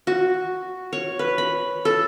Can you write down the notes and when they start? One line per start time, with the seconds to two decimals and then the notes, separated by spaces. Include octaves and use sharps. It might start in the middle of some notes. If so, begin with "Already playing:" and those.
0.07 F#4
0.93 C#5
1.19 B4
1.38 B5
1.85 A4